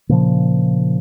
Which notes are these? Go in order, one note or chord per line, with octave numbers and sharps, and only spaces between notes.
A#2 C#3 F3